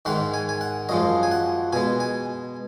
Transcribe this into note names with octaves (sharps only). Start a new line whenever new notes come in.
G#2 D#3 G#3 F#5
G#5
G#5
F#5
F#2 F3 G#3 D#5
G#5
F#5
B2 G#3 G#5
G#5